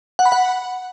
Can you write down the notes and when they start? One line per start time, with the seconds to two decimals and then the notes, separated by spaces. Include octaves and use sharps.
0.19 F#5
0.26 B5
0.32 F#5